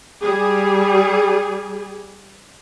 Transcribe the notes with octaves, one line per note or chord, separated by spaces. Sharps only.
G3 G#4